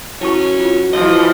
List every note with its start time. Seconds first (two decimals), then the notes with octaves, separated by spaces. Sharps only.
0.21 F#3 C#4 E4 A5 C#6
0.60 F4
0.93 E3 F3 D#5